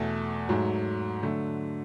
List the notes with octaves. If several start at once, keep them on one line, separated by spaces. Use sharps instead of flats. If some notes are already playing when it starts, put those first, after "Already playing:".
Already playing: E2 B2 A3
G#2 F#3 A3
D3 F#3 A3